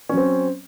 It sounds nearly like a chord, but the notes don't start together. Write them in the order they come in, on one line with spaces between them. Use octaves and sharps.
C#4 F#3 C4